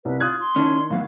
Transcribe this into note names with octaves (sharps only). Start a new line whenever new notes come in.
C2 B4
F4 D#6 F#6 G#6
C6
D#3 C#4 D4 E4
A2 F#3 B3 F5